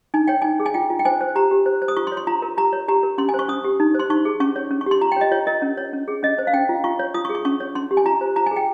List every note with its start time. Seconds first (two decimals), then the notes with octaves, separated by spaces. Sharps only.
0.14 D#4 G#5
0.28 C#5 G5
0.42 D#4 G#5
0.60 G#4
0.66 G#5
0.74 F4 G5
0.90 F4
0.99 G5
1.05 C5 G#5
1.21 C5
1.35 G4 A#5
1.51 G4
1.66 C5
1.82 C5
1.88 D#6
1.97 F4 C#6
2.07 C6
2.12 C#5
2.17 C6
2.27 F4 A#5
2.42 A#4
2.57 G4 A#5
2.73 C#5
2.88 G4 A#5
3.03 A#4
3.18 C#4 C6
3.29 G#5
3.34 C5 C#6
3.48 C#4 D#6
3.65 G4
3.80 D#4
3.95 C5 C6
4.10 D#4 C#6
4.25 G#4
4.40 C#4 C#6
4.56 C#5
4.71 C#4
4.81 C#6
4.86 G4 C6
5.01 F4 A#5
5.12 G5
5.16 C#5 D#5
5.32 F4 C#5
5.47 A#4 D#5
5.62 C#4
5.77 C#5
5.93 C#4
6.08 G#4
6.23 C#4 D#5
6.39 C5
6.47 F5
6.53 C#4 G5
6.69 F4
6.84 F4 C#6
6.99 C#5
7.14 F4 D#6
7.25 C#6
7.29 G#4
7.35 C#6
7.45 C#4 C#6
7.60 C#5
7.75 C#4 C6
7.91 G4
7.97 G#5
8.06 F4 A#5
8.21 C5
8.36 F4 A#5
8.46 G#5
8.51 G#4
8.56 G5